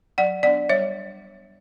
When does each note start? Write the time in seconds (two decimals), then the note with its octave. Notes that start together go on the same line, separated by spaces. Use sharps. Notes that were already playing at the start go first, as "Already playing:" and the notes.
0.18 F#3 D5 F#5
0.43 B3 D4 D5 F#5
0.69 G3 C#5 E5